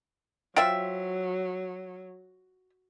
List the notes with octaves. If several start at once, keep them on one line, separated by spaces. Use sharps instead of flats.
F#3 F4 C5 E5 G5